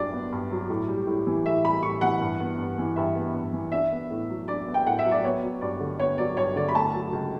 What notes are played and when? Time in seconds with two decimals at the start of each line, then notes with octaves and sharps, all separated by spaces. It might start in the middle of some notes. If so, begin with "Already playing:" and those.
Already playing: G2 F#3 D4 D5
0.13 B3
0.32 G2
0.51 F#3
0.70 A2
0.88 G3
1.07 A2
1.27 E3
1.45 A2 E5
1.64 G3 B5
1.83 A2 C#6
2.01 E3 F#5
2.21 G2
2.40 B3
2.58 G2
2.78 E3
2.96 G2 E5
3.15 B3
3.35 G2
3.53 E3
3.72 D4 E5
3.92 B3
4.11 A2
4.29 F#3
4.48 D4 D5
4.67 B3
4.74 G5
4.86 A2 F#5
4.99 E5
5.05 F#3
5.11 D5
5.24 B3 C#5
5.43 F#3
5.61 G2 D5
5.80 D3
5.99 B3 C#5
6.18 F#3 D5
6.37 G2 C#5
6.56 D3 D5
6.68 B5
6.75 A3 A5
6.94 F#3
7.13 C#2